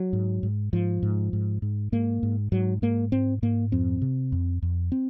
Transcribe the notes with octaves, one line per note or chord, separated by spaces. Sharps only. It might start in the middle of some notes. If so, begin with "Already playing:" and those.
Already playing: F#3
G#2
G#2
G#2 F3
G#2
G#2
G#2
G#2 A#3
G#2
G#2 F#3
G#2 A#3
G#2 C4
G#2 A#3
F2 C4
C3
F2
F2
C4